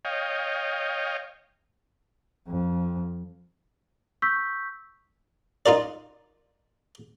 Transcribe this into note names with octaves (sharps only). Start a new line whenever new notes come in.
C#5 D#5 F5 G5
F2
C#6 E6 G6 B6
D#4 F4 A#4 D5